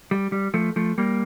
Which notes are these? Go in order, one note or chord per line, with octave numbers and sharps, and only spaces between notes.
G3
G3
F3 A3
F3 A3
G3 A#3